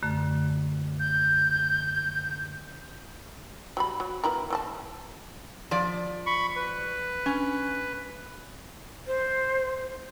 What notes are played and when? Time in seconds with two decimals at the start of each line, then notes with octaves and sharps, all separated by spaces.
0.03 F#2 D3 A3
1.00 G6
3.77 F#3 G3 B5
4.00 F#3
4.24 B3 E4 A#4
4.50 E3 A4 A5
5.71 F3 D5
6.26 B5 C#6
6.56 B4
7.26 C#4
9.07 C5